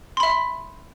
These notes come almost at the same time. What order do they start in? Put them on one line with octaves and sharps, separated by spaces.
C6 B5 E5